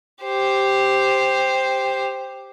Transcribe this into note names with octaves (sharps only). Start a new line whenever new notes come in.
G4 C5